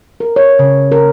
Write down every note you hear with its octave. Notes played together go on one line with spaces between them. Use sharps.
A#4
C#5
C#3
A#4